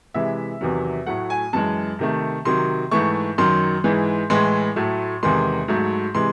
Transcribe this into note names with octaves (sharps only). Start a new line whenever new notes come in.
C3 E3 G#3 E5
E2 C3 D#3 F#3
A2 F#3 A3 F#5
G#5
F#2 E3 G#3 A5
C3 D#3 A3
C3 D#3 F#3 C6
G#2 E3 A3 C#6
F#2 D#3 F#3 C6
G#2 E3 G#3
A2 E3 G#3 C6
A2 F#3 A3
E2 C3 D#3 G#3 C6
G#2 F#3 A3
C3 E3 G#3 C6